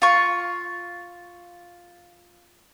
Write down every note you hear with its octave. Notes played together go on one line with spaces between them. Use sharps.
F4 C#6